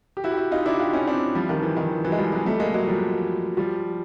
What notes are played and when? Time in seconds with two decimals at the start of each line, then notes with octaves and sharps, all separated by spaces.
0.17 G4
0.24 E4 F#4
0.32 G4
0.37 E4 F#4
0.52 D#4 F4
0.66 D4 E4
0.73 F#4
0.80 F4 G4
0.93 C#4 D#4
1.07 C4 D4
1.35 F3 G3
1.49 D#3 F3
1.62 E3
1.77 D#3
1.91 E3
2.05 E3 F#3
2.12 G#3
2.18 F3 G3
2.32 F#3 G#3
2.46 G3 A3
2.60 G#3 A#3
2.74 F#3 G#3
2.87 F3 G3
3.57 F3 G3